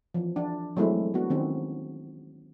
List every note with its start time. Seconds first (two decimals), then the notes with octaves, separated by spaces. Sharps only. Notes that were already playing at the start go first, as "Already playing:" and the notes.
0.14 E3 F3
0.36 D4
0.76 E3 F#3 G#3 A3 C4 E4
1.14 B3 D4 F#4
1.30 D#3 C4 C#4